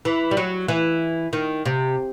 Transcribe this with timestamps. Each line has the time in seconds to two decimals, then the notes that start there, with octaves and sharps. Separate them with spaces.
0.05 E3
0.31 G3
0.37 F#3
0.68 E3
1.33 D#3
1.66 C3